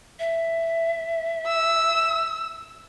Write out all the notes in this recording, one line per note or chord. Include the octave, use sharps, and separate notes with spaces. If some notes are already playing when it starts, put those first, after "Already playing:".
E5
E6